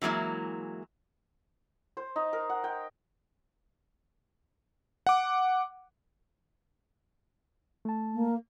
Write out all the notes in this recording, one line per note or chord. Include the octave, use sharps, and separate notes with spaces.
E3 F#3 G#3 A#3 E4
C5
D#4
A#4
F#5
G5
F#5 D6
A3 A5
A#3